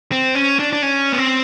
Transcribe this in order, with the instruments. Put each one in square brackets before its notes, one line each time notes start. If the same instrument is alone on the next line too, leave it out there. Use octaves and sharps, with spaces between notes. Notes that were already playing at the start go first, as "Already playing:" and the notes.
[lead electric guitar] C4
C#4
D4
D4
C#4
B3
C4